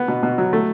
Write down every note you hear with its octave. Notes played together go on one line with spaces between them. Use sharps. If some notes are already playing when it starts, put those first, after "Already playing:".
Already playing: B3
B2
B2
F#3
A3